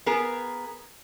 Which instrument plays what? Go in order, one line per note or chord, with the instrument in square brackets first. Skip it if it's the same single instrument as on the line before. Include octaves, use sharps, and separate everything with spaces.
[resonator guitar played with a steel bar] B3 G#4 A#4